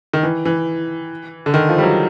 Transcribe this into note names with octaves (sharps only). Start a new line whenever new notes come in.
D#3
E3
E3
D3
D#3
F3
G3
F#3